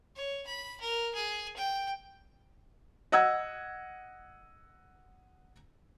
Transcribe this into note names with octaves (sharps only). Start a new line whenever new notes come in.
C#5
B5
A#4
G#4
G5
D#5 F#5 E6 G#6